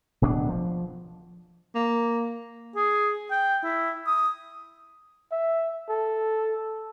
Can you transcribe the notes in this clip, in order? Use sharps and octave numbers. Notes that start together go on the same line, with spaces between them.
D1 B2 C#4 D4
F3
A#3
G#4
G5
E4
D#6
E5
A4